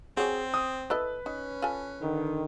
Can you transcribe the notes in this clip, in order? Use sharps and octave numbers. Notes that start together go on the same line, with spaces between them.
C4 F#4 G#4 C#5
D#6
E4 A4 B4 D#5
C#4 D#4
F4 A4 G#5
D3 D#3